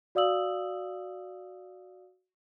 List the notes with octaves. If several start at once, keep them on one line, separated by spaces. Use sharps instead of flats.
F#4 D5 F5 D#6 E6 F#7